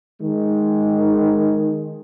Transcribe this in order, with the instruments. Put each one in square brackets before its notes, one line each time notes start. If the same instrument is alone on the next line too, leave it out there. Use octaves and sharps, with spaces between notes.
[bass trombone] D#3 [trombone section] G#3